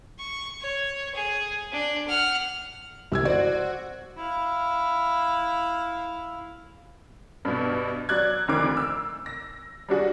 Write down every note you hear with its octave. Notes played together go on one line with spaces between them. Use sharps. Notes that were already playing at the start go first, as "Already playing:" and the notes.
C#6
C#5
G#4
D4
F#5 F6
C2 C3 E6 G#6
F#4 C5 D5
E4 F5
G2 B2
F#3 D5 F#6 G#6
F1 D2 D#3 C4 D6
E6
A#6
G3 D4 F#4 G#4